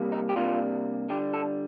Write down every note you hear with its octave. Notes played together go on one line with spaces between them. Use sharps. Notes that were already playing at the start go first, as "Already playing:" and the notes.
Already playing: C3 G3 A#3
D#4
G4
C3 G3 A#3 D4 F4
D3 G3 D4 G4
A4